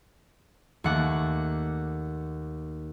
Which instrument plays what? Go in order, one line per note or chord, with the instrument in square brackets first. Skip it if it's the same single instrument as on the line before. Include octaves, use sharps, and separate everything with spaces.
[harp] D#2 A3 F#5 D6